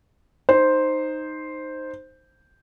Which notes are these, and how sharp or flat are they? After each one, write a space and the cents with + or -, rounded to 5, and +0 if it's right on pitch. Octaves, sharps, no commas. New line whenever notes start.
D#4 -5 C5 +0